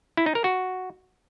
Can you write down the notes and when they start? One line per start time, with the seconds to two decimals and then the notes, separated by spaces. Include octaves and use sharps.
0.17 E4
0.26 D#4
0.35 A#4
0.44 F#4